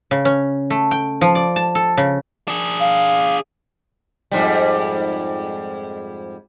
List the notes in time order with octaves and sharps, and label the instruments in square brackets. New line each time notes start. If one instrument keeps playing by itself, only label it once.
[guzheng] C#3
C#4
A3
G5
F3
D5
A5
A4
C#3
[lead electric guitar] D4 G#4
[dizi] F5
[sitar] F2 G#2 G3